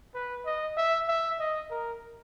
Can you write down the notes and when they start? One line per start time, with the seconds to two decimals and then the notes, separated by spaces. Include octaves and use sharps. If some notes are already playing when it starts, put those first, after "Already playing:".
0.15 B4
0.46 D#5
0.77 E5
1.08 E5
1.39 D#5
1.70 A#4